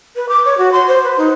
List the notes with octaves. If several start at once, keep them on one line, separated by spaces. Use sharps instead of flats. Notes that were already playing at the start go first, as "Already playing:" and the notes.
B4
D6
C#5
F#4
C6
C5
B4
D#4